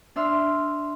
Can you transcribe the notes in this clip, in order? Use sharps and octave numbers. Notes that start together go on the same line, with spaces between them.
D4 E5 C6 E6 F6